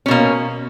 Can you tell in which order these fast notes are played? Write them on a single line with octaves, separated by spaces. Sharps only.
C#4 B2 A#3